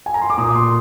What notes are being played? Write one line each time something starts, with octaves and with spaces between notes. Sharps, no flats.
G#5
A#5
C6
D6
A#2 D#6
C6